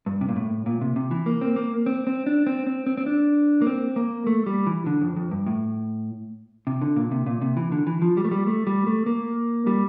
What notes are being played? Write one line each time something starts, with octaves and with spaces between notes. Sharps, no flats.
G2
C3
A#2
A2
A#2
C3
C3
E3
A#3
C4
A#3
C4
C4
D4
C4
C4
C4
C4
D4
A#3
C4
A#3
A3
G3
E3
D3
F2
F2
G2
A2
C3
D3
A#2
C3
A#2
C3
E3
D3
E3
F3
G3
A3
G3
A3
G3
A3
A#3
G3